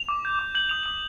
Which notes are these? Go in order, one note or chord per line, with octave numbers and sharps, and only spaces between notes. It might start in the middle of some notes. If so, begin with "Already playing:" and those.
Already playing: F7
D6
G6
D6
G6 F#7
D#6 F7
D#6 F#7